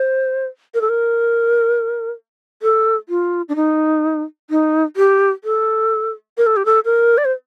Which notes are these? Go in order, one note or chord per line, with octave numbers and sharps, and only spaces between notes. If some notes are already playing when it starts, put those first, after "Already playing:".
Already playing: C5
A#4
A4
A#4
A4
F4
D4
D#4
D#4
G4
A4
A#4
A4
G4
A4
A#4
D5
C5